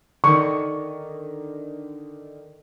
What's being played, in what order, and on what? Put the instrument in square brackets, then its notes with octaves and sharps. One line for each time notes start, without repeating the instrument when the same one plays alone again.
[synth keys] D3 D#3 [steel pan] C#6